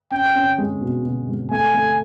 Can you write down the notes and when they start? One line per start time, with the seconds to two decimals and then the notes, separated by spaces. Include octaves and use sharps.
0.11 C#4 G5
0.35 C#4
0.58 G#3
0.81 B2
1.05 B2
1.28 G#3
1.51 A3 G#5
1.74 A3